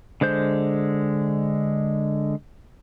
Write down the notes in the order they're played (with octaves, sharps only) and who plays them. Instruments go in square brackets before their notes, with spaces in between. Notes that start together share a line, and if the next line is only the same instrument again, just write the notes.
[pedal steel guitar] D3 G#3 C5 G6